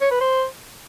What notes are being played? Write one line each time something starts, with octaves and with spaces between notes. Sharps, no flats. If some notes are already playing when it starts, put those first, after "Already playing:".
C#5
B4
C5